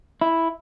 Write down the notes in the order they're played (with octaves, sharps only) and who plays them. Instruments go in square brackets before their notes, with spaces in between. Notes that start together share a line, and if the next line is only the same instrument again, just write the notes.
[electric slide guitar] E4